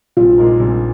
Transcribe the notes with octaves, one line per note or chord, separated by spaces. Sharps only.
A#1 F4
A#2 G#3 D#4 A#4
A#1